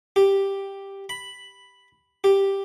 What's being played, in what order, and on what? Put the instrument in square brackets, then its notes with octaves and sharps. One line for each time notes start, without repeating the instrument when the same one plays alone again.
[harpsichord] G4
B5
G4